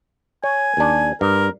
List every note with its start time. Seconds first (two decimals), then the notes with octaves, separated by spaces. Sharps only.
0.44 C#5 G#5
0.77 D#2 D4
1.21 G2 A#4